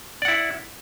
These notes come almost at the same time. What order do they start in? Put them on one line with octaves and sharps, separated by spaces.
D5 F#5 E4